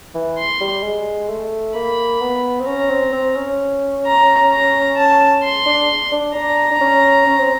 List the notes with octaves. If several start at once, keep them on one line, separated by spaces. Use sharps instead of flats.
E3
C6
G3
G#3
A3
A#3 B5
B3
C4
C#4 A#5
C4
C4
C#4
A#5
A#5
A5
C6
D4
D4
D4 A#5
D4
C#4
C#4
C4